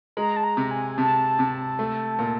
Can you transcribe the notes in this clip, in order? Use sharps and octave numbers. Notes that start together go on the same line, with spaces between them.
G#3 A#5
A5
A#5
C3
G#5
C3 A5
C3
A3
A#2